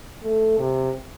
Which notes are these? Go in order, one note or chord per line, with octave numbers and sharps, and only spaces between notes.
A3
C3